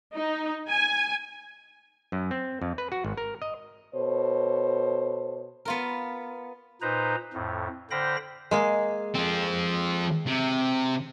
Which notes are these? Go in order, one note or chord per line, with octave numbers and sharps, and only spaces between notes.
D#4
G#5
F#2
C4
F2
B4
F#4
G#1
A#4
D#5
B2 A4 C5 C#5
B3 F4 A#4
A#2 D#4 B4 C5 A#5
F2 A2
D3 C5 F5 G5 B5 A#6
G#3 A#3 G#4
F3 C4
C3